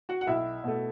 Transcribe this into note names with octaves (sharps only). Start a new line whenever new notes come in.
F#4 F#5
F#5
B1 E4 E5
B2 A3